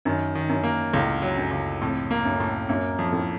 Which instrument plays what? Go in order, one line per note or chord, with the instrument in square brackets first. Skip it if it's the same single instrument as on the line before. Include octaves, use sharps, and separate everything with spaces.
[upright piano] F#2 [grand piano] D#3
[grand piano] D#3
[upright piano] F#2
[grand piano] A#3
[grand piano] C#2 [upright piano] A2
[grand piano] F#3
[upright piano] F#2
[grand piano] C#2
[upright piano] F2 [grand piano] A2
[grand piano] A#3
[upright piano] F#2
[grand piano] A2
[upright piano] F#2 [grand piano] A#3
[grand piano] F2
[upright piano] A2